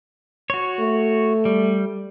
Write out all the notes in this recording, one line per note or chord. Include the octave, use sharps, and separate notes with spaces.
F#4 C#5
A3
G3